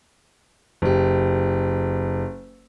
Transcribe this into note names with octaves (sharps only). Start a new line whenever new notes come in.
F#1 G4